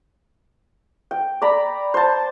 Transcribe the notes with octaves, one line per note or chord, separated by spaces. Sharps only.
G5
D5 A#5 B5
C5 A5